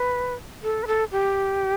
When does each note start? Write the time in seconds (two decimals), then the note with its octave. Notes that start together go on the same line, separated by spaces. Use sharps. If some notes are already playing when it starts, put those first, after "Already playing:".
Already playing: B4
0.63 A4
0.83 B4
0.87 A4
1.12 G4